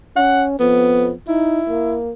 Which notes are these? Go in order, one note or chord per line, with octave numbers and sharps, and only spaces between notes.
C#4 F#5
F2 B3
D#4 E4
A#3